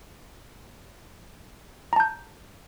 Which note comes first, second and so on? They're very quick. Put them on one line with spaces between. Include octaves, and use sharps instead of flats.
A#5 A5 G6